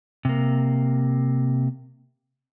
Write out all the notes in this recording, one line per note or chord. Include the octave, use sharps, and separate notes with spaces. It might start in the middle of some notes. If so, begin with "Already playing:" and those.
C3 A#3